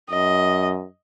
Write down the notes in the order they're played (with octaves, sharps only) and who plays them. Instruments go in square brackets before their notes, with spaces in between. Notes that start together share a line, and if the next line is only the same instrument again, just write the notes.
[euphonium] F#2 [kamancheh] D#5